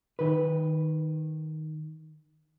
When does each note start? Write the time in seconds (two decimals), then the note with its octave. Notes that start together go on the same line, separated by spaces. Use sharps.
0.19 D#3 B4